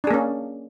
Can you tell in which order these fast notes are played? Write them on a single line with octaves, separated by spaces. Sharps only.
D4 G#4 A#3 C#4